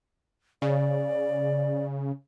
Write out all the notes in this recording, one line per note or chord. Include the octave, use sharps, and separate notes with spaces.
C#3 D5